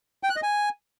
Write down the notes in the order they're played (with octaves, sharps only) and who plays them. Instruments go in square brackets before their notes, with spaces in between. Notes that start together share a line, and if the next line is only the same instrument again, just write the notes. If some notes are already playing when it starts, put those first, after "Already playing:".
[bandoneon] G5
F#6
D#5
G#5